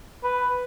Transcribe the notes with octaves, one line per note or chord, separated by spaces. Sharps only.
B4